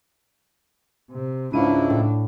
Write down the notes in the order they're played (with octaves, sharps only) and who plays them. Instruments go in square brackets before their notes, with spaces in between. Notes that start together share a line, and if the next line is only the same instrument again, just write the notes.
[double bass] C3
[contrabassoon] C#2 [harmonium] G#2 E4 [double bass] D4 [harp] C#5 F5 D#7
[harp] A2